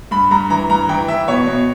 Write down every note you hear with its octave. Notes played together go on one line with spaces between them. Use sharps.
G2 B5
G2 A#5
E3 A#5
G2 A#5
E3 G5
E3 E5
B2 C#5
B2